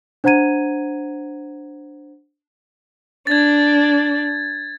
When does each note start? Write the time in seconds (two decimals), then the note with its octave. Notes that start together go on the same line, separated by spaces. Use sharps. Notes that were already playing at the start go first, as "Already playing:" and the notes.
0.24 D4 C5 F#5 A#5 G#6 D#7
3.27 D4 G#6 A6